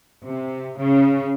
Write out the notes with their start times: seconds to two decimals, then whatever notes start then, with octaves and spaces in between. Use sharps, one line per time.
0.24 C3
0.77 C#3